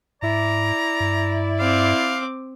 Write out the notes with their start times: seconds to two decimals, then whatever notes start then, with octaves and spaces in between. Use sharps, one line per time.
0.22 G#2 E4 D5 A#5
1.00 G2
1.60 C4 F5 D6